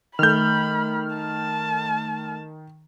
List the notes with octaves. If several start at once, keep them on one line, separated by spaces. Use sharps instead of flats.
D#3 A3 B5 F6 G6
A5